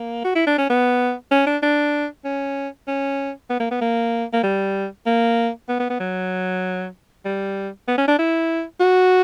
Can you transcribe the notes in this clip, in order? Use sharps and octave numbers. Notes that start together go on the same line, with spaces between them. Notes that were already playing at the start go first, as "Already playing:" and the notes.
Already playing: A#3
F#4
E4
D4
C#4
B3
C#4
D4
D4
C#4
C#4
B3
A#3
B3
A#3
A#3
G3
A#3
B3
B3
B3
F#3
G3
B3
C#4
D4
E4
F#4